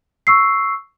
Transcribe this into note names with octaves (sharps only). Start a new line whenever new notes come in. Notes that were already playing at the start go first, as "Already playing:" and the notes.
C#6 E6 C7